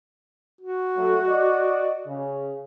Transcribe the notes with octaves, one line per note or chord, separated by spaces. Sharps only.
F#4
F#3 A3
D5 D#5
C#3